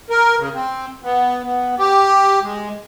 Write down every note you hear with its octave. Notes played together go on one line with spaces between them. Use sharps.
A#4
C#3
C4
B3
B3
G4
G#3